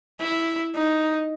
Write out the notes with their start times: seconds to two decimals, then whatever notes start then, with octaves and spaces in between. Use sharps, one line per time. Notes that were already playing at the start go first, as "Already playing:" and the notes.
0.21 E4
0.75 D#4